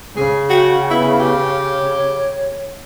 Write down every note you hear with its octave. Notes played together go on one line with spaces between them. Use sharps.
C#3 G#4
F#4 G5
B3 E4
G4
C#5